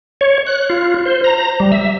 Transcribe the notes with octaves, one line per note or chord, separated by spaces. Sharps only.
C#5
F#6
F4
C5
A#5
G3
E5